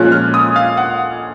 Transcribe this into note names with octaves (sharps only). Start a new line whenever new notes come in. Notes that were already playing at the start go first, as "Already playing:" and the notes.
Already playing: A#2 F3 G#3 C#4 F#6
F6
D#6
F5
F#5